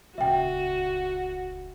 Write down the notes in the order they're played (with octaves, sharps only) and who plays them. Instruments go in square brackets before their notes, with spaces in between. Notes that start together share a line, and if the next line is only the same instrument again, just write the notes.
[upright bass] D#1 C#2 [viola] F#4 [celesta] E5 G5